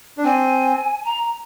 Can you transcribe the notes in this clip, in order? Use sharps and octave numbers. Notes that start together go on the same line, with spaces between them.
D4
C4 G#5
A#5